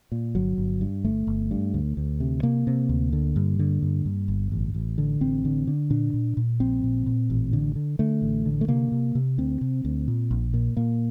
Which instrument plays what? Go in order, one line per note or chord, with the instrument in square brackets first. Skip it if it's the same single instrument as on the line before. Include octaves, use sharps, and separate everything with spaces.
[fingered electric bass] A#2
G1 F#3
G1
G2
G1 A3
G1
G2
D2
D2
C3
C3 A#3
C3
D2
D3
G2
D3
G2
G2
G1
A1
A1
D3
A1 C4
D3
D3
A#2 D4
A#2
A#2
A#1 C4
A#2
A#2
A1
D3
D3
D3 A3
A1
D3
A3
C3 A#3
C3
C3
D2 C4
C3
D2
A#2
A#1
A#2
A#2 A#3